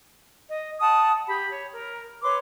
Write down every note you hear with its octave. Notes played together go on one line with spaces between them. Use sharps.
D#5
F#5 A5 D#6
G4 B5
C#5
A#4
B4 C#5 C6 D6